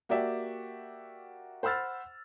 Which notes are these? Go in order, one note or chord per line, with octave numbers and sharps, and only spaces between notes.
A#3 F#4 G4 D5 E5 G5
C5 F#5 B5 E6 F6 A6